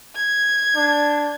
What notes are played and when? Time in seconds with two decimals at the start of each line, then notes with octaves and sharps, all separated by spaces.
0.16 G#6
0.76 D4